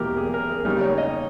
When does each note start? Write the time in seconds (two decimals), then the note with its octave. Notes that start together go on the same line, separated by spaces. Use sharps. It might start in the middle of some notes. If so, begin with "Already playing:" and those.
Already playing: E2 B2 A#3 E4 G4 A#4
0.17 G#4
0.34 A#4
0.50 G#4
0.65 C#3 G3 A#3 D#4 A#4
0.81 C#5
0.98 D#5